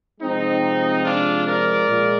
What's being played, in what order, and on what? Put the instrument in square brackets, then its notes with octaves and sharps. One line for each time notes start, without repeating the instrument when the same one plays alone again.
[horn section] C3 F3 G#3 C4 D#4
D4 F4
A#4 D5
A#2 G#3